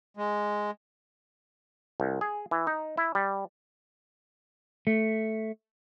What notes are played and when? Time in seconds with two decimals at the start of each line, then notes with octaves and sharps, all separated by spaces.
0.17 G#3
2.00 C2
2.21 G#4
2.51 E3
2.67 D#4
2.97 E4
3.15 G3
4.87 A3